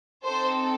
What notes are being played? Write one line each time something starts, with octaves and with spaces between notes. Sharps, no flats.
C4 D#4 A4 C5